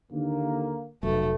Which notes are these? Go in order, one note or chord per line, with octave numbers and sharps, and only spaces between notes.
D#2 D3 A#3
F1 B1 F#3 A3